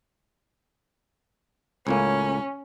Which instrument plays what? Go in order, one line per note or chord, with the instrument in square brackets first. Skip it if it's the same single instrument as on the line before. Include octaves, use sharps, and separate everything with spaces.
[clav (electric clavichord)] C#2 A2 A#3 [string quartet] C#4